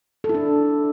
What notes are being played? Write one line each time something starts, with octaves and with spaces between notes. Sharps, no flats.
A4
E4
D4